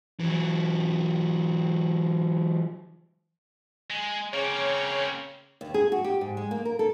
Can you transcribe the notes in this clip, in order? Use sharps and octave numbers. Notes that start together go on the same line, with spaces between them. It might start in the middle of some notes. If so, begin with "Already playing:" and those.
E3 F#3
G#3
C#3 A#3 C4 C#5
D#2
G#4
F#4
G4
G#2
G#3
A#3
A#4
A4